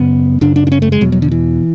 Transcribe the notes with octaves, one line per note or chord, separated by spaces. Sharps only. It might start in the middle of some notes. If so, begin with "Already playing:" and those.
Already playing: F#2 C#3 B3
F#2 C#3 D4
D4
D4
C#4
A3
G#3
E2 B2 F#3
F#3
D3
E3